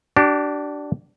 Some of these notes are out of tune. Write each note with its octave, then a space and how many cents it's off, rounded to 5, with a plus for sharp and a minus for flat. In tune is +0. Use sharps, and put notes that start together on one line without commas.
D4 +0 G4 -40